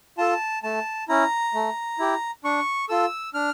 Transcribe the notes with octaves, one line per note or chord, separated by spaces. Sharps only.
F4 A4 A5
A3 A5
C#4 E4 A#5
A3
E4 G4
D4 C#6
F4 A4 E6
D4 F6